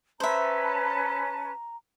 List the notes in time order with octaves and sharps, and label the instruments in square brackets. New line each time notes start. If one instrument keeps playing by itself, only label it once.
[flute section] C#4 B4 A5 [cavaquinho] C5 E5 [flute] A#5